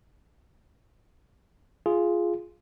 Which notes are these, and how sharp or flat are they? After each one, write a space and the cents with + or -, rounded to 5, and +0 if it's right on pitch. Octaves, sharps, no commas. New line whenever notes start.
F4 -5 G#4 +5